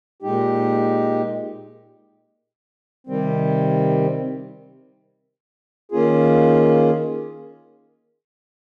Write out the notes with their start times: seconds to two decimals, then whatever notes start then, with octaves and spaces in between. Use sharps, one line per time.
0.22 A#2 G#3 D#4 G4
3.07 C3 D#3 G3 C4
5.92 D#3 A#3 C#4 F4 G#4